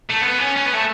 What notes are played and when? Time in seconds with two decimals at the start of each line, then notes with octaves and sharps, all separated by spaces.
0.10 A3
0.22 B3
0.39 C#4
0.57 C#4
0.66 B3
0.74 A3